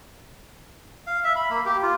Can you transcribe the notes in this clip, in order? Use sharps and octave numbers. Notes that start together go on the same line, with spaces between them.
F5
E5
B5
A#3
G4
F4